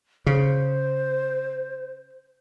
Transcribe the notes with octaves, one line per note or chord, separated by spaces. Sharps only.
C#3 C5